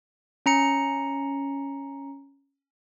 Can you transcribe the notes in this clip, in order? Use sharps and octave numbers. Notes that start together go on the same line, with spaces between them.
C#4 A#5 C#7